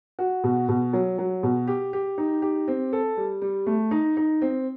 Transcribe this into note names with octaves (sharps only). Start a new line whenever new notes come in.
F#4
B2
B2
F#3
F#3
B2
G4
G4
D#4
G4
C4
A4
G3
G3
A3
D#4
D#4
C4